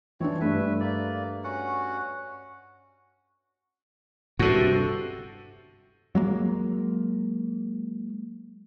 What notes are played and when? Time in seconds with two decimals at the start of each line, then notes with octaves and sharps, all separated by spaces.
0.20 E3 C4 D4 C#5
0.41 G2 A3 B4 E5
0.80 A#3 D5
1.44 C#4 F#4 F#5
4.39 G2 C3 F#4 A4
6.15 F#3 G#3 A#3